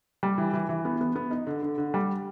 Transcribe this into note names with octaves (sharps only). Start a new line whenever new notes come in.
G3
E3
E3
E3
B3
B3
B3
D#4
D3
D3
D3
G3